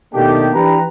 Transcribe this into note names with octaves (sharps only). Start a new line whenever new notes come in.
B2 D#3 A3 A#3 D4 G4
E3 D4 G4 B4 A#5